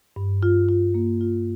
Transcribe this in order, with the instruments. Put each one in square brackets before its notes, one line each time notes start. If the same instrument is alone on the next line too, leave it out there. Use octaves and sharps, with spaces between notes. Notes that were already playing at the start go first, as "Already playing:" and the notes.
[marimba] G2
F4
F4
A#3
F4